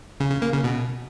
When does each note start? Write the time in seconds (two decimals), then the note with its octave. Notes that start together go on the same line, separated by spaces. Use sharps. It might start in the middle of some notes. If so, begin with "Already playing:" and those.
0.20 C#3
0.31 C#3
0.42 A#3
0.53 C#3
0.64 B2